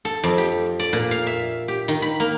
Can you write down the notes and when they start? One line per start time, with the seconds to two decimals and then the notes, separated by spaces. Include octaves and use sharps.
0.05 A4
0.24 F2
0.38 G4
0.80 D5
0.93 A#2
1.11 F5
1.27 E5
1.68 G4
1.88 D#3
2.02 B5
2.20 A#3